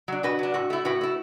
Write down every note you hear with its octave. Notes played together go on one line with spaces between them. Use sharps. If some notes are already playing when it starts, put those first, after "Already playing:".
F#3 D4
B2 F#4 B4
F#3 D4
A2 F#4
A3 E4
A2 F#4 B4
A3 E4